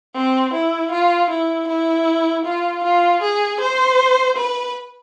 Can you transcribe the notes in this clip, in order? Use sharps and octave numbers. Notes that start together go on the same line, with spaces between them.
C4
E4
F4
E4
E4
F4
F4
G#4
C5
B4